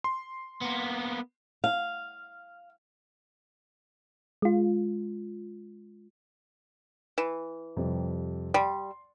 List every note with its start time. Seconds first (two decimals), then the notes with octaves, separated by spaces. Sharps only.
0.04 C6
0.61 A#3 B3
1.64 F5
4.42 G#3 F4
7.18 E3
7.77 F2 C3 G3
8.54 G3 C6